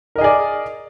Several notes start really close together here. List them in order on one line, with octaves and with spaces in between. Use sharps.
A#4 D#5 G#4 D5